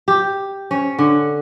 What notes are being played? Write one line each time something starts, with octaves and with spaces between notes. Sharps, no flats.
G4
C#4
D3